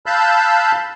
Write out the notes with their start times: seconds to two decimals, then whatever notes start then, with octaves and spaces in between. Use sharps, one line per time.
0.06 F5 A5 B5 E6 F#6 G6